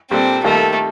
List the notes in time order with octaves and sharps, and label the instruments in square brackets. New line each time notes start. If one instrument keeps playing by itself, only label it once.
[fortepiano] A#2 G3 D4 A4 [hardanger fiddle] C4
[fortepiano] D#3 G3 A#3 F4 A4 [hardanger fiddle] A3